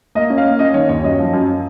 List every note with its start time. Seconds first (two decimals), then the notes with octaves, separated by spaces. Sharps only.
0.15 A#3 D#5
0.30 C#4
0.38 F5
0.45 A#3
0.59 C#4 D#5
0.74 D#3 C#5
0.89 D#2 C#5
1.04 F#2 D#5
1.18 F3
1.33 F#2